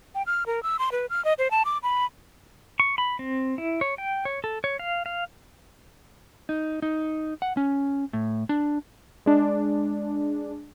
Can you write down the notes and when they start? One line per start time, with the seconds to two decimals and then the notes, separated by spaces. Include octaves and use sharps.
0.15 G5
0.27 F6
0.47 A#4
0.63 E6
0.79 C6
0.92 B4
1.10 F6
1.25 D#5
1.39 C5
1.51 A5
1.65 D6
1.83 B5
2.80 C#6
2.98 B5
3.19 C4
3.58 E4
3.81 C#5
3.98 G5
4.25 C#5
4.44 A4
4.64 C#5
4.79 F5
5.06 F5
6.49 D#4
6.82 D#4
7.42 F#5
7.57 C#4
8.13 A2
8.49 D4
9.26 G#3 D4